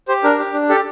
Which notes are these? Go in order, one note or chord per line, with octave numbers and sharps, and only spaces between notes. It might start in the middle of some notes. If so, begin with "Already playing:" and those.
G4 C5
D4 A#4
G4
D4
G4 A4